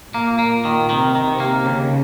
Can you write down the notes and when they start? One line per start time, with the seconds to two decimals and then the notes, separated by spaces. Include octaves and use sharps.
0.13 A#2 A#3
0.39 A#3
0.65 D#3
0.90 C3 D#3
1.15 D#3
1.27 C3
1.40 A#3
1.65 D#2 C#3